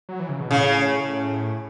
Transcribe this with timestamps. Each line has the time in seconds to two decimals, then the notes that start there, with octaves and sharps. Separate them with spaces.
0.09 F#3
0.20 E3
0.29 C#3
0.40 B2
0.50 A2 C#3